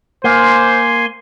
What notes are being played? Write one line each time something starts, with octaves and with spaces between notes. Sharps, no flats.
A#3 C5 G#5 C6